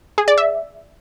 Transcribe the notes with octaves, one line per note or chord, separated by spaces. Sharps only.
G#4
D5
E5